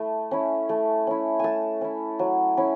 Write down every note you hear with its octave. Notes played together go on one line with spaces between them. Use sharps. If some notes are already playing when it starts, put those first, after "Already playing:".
Already playing: A3 E4
C#4 E4
A3
C#4 E4
A3 G#5 A5
C#4 E4
F#3
C#4 E4